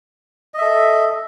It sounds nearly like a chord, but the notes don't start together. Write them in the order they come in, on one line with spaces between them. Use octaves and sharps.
D#5 E5 A4